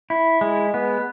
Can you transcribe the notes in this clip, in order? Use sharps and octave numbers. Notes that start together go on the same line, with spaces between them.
E4
G#3
B3